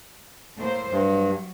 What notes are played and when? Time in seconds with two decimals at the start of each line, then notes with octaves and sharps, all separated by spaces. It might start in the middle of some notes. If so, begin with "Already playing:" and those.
0.58 A2 A#3 C5
0.92 G2 F#3